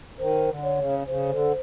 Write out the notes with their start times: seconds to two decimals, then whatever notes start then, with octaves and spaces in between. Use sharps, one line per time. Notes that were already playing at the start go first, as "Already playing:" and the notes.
0.18 D#3 C5
0.48 D3
0.63 C#5
0.78 C#3
1.07 C#3 C5
1.29 D3